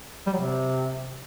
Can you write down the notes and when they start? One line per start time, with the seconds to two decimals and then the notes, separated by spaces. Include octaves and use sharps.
0.26 G3
0.33 F#3
0.39 C3